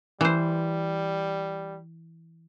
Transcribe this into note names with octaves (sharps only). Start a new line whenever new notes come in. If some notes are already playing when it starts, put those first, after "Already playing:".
E3 G3 C5